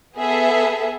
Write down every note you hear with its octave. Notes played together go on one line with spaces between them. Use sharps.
B3 G#4 A4 E5